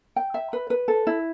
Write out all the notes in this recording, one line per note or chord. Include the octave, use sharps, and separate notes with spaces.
G5
E5
B4
B4
A4
E4